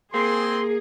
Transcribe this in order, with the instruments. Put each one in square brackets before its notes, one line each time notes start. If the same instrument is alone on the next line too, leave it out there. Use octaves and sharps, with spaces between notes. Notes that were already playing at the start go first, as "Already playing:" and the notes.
[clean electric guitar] A#3 [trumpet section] C4 C6 [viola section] G#4